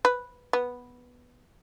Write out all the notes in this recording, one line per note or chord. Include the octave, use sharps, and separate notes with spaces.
B4
B3